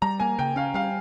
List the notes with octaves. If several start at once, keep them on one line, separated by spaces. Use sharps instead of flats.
G3 A#5
A#3 G#5
C#3 G5
C#4 F5
G3 F5